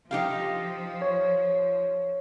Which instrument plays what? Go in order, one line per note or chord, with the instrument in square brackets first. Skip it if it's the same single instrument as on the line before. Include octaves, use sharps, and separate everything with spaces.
[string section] F3 [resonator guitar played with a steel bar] D#4 G4 F5
[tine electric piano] C#5